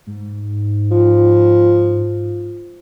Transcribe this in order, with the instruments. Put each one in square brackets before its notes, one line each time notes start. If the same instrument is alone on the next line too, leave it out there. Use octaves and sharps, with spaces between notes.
[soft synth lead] G#2
[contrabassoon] F3